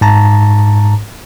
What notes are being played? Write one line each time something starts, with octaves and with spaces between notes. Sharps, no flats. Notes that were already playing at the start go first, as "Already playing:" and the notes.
G#2 A5 A#5